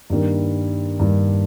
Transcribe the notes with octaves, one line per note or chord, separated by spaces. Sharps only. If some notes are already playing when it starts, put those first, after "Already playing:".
G2 D#3 G3 A#3 D4
G2 D#3 G3 A#3 D4